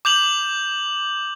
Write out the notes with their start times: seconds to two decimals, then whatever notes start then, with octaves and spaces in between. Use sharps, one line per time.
0.05 D6 G6 F7 F#7